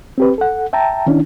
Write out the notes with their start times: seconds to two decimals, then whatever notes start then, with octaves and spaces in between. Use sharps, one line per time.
0.18 C4 G4 B4
0.38 A4 F#5
0.73 E5 G5 A5 A#5
1.07 D#3 C#4 D4 E4